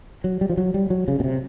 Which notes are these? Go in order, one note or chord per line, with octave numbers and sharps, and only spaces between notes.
F#3
G3
F3
F#3
G3
F#3
C#3
B2
C3